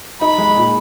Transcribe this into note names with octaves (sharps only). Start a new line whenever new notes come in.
D#4 B5
G#3
A#2